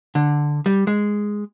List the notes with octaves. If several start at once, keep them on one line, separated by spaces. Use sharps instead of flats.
D3
G3
G#3